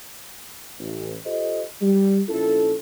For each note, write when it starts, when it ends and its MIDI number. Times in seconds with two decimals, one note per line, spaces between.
0.79 1.14 33
1.25 1.62 65
1.25 1.62 67
1.25 1.62 69
1.25 1.62 72
1.25 1.62 75
1.81 2.20 55
2.28 2.74 34
2.28 2.74 61
2.28 2.74 64
2.28 2.74 65
2.28 2.74 69